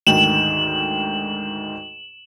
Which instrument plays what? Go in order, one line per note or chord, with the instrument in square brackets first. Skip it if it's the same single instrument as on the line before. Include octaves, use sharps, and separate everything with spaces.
[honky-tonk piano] D2 G#2 D#3 [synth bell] E7 F#7